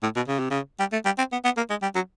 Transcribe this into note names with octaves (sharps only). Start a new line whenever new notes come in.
A2
B2
C#3
C3
C#3
G3
A3
G3
C4
B3
B3
A#3
G#3
G3
F#3